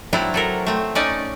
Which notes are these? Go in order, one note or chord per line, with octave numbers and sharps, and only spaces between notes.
F#3 C4 D4 E4 F4
F#3 A4 A#4
A3 C4
C#4 D#4 D5 D#5